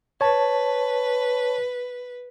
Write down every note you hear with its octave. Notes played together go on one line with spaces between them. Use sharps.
B4 C#5 A5